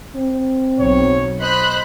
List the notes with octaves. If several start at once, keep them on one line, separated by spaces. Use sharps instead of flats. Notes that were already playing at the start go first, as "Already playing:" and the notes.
C4
B1 C#5
C5 D#5 B5 F#6